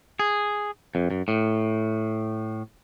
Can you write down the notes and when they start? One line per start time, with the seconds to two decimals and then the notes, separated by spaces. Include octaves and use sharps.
0.19 G#4
0.95 F2
1.11 F#2
1.28 A2